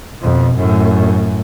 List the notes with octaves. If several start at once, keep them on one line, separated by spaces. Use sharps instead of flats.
F2 B2
F#2 A2